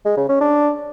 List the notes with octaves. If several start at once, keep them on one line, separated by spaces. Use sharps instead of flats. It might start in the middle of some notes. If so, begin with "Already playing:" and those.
G#3
C#3
C#4
D4